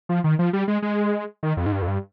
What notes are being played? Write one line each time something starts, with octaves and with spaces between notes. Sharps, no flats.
F3
D#3
F3
G3
G#3
G#3
D#3
F2
G#2
G2
F2
G2